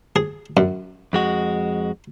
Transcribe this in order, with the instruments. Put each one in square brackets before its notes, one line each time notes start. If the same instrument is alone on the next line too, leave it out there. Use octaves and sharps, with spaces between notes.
[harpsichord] G#4
F#2
[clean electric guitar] F2 G#3 F#4